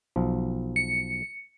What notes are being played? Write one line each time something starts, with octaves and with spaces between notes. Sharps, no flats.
B1 F3
C#7